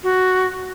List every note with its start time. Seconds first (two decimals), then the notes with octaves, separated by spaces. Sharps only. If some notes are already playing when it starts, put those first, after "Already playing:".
0.03 F#4